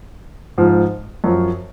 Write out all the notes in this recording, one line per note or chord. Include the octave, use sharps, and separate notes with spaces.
G#2 F3
F#2 F3